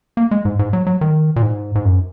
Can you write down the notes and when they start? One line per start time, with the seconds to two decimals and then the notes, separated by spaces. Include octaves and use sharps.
0.17 A#3
0.31 G#3
0.45 G#2
0.59 G#2
0.73 F#3
0.87 F#3
1.01 D#3
1.36 A#2
1.43 G#2
1.75 G#2
1.85 F#2